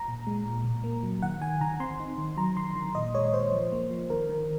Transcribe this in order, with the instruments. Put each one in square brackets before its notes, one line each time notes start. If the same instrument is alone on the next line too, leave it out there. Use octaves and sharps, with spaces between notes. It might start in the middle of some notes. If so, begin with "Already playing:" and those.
Already playing: [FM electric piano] A#5
A#2
G#3
A#2
A#2
A#3
F#3
D#3 F#5
D#3 G#5
D#3 A#5
C4 C6
D#4
D#3
F#3 A#5
D#3 C6
D#3
A#2 D#5
G#3 C#5
A#2 C5
F3
A#3
F3
D#3 A#4
D#3